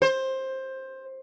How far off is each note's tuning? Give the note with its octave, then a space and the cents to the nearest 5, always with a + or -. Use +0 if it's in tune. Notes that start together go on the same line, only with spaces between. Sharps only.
C5 +15